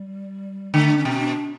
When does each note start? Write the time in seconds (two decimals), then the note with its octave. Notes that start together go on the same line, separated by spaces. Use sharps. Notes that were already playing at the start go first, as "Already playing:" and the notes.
Already playing: G3
0.74 D3 A3
0.97 C#4
1.05 B2
1.10 C#4
1.20 D4